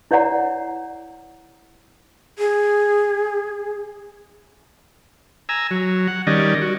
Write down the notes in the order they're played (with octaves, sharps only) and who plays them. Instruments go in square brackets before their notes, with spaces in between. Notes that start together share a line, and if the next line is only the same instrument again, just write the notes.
[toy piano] E4 C#5 D5 F#5 A#5
[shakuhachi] G#4
[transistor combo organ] G#5 A#5 E6
F#3
F#5
D#3 G3 C#4 D5 D#5
F#4